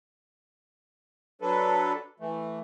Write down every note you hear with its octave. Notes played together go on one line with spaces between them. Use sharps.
F#3 D4 A4 B4
E3 A3